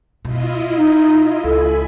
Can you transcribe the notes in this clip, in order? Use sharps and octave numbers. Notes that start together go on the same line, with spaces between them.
B2 E4 F4 D#5
D#4
C#2 A4 G#5 B5